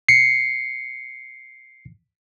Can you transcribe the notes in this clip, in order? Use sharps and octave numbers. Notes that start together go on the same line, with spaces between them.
C7 C#7